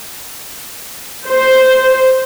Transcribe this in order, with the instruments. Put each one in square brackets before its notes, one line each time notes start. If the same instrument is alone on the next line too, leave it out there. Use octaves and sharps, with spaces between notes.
[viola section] C5